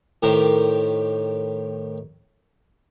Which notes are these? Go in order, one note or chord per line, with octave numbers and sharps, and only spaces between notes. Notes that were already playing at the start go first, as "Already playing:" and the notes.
A2 D#3 G4 A#4 C5